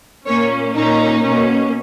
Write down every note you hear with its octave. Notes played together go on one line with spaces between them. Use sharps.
A#2 A#3 C#4 C#5
A#2 A#3 C#4 D#4
B2 A#3 C#4